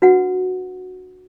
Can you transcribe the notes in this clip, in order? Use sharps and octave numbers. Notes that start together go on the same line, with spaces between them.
D4 F#4 B4 F#5